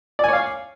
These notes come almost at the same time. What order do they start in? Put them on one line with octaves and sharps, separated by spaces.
D5 G#5 C#5 F5